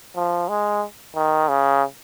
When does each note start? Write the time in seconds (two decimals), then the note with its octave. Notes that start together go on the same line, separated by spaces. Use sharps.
0.16 F3
0.49 G#3
1.15 D#3
1.49 C#3